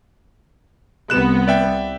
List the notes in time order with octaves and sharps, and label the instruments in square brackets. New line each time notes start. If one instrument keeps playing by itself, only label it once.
[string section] C2 B3 [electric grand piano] F#6 E7
[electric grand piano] D5 E5 G5